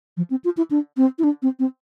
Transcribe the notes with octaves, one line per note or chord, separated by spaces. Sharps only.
F3
C4
F4
E4
D4
C4
E4
D4
C4
C4